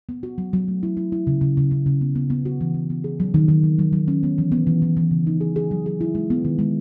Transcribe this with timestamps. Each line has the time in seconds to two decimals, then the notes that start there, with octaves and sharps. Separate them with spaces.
0.09 B3
0.23 F#4
0.38 F#3
0.53 F#3
0.68 A3
0.83 E4
0.97 E4
1.12 E4
1.27 C#3
1.41 C#3
1.57 C#3
1.71 C#3
1.86 C#3
2.01 B3
2.15 B3
2.30 B3
2.45 F#4
2.61 E3
2.74 E3
2.90 B3
3.04 G#4
3.20 F#3
3.34 D#3
3.48 D#3
3.63 F#3
3.79 F#3
3.93 F#3
4.08 C#4
4.23 B3
4.38 E3
4.52 B3
4.67 E3
4.82 E3
4.97 E3
5.11 C#3
5.27 D#4
5.41 G#4
5.56 G#4
5.71 F#3
5.86 G#4
6.01 E4
6.15 G#3
6.30 B3
6.45 D#3
6.59 G#3